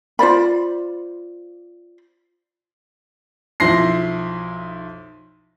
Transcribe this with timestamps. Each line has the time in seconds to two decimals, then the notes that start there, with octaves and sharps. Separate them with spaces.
0.19 F4 C5 D5 B5
3.60 B1 F3 E4 C6 A#6 C7